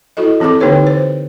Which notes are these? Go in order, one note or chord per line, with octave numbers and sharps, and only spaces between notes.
E4 F#4 A4 D#5
E3 C4 G#4 A4 D6
D3 A#3 D#4 G4 B4 C#5
C5